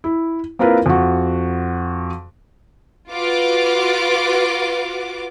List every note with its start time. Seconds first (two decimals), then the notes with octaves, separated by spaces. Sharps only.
0.04 E4
0.59 A#3 C4 E4 F4 A#4 B4
0.86 F2 F#4
3.11 F4 F#4 B4 D6